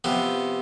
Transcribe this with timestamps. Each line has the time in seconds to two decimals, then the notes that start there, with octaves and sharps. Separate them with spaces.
0.04 C3 F3 B3 G4